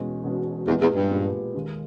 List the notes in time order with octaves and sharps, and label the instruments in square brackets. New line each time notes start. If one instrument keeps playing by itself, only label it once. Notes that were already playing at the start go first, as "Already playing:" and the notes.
Already playing: [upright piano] E1 E2 B2 G#3 C#4
E1 E2 B2 G#3 C#4
[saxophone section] E2 [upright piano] A#2 G#3 B3 G4
[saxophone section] E2
G2
[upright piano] A#2 G#3 B3 G4
D#2 D#3 G#3 D#4